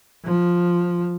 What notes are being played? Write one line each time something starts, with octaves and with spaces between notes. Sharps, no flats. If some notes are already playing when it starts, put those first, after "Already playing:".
F3